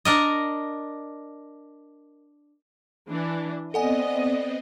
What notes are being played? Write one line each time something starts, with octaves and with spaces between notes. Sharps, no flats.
D4 A#4 D#5
E3 D4
B3 C4 A4 D5 D#5 F#5 G#5